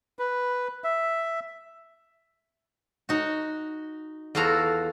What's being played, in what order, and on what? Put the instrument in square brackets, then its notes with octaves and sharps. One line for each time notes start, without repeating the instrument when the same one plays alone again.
[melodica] B4
E5
[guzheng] D#4 F#4
E2 F4 F#4 A4 A#5